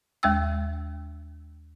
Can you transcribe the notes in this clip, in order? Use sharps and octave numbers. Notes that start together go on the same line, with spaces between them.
D#2 G#3 G5 E6